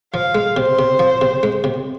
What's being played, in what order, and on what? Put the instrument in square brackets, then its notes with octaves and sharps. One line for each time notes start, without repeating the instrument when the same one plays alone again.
[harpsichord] F3 [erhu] F5
[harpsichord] G#3
[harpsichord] C3 [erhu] C5
[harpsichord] C3
F3
C3
G#3
C3